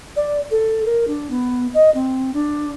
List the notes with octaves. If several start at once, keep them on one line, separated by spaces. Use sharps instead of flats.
D5
A4
A#4
D4
B3
D#5
C4
D4